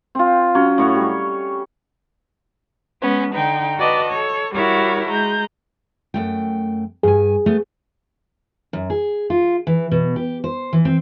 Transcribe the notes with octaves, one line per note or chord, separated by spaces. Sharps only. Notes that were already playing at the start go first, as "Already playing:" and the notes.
C4 F4
F#3 C#4
A2 C#5 F#5
G3
G#3 B3 C#4
D3 D#4 G5
F#4 B4 D5 D#5 A5
A4 C#5
G3 E4 F#4 A#4 C#5
G#3 A#5 G6
F#2 A3 G5
G2 G#4 G#5
A3 B3
F#2
G#4
F4
E3
B2
G4
C5
E3
C4